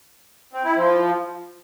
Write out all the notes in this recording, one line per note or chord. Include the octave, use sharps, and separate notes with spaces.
C4
E4
F3